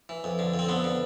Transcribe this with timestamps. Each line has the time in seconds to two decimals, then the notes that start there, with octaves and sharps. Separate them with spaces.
0.09 E3
0.24 F2
0.39 D3
0.54 F2
0.59 C4
0.69 D3 B3
0.84 D3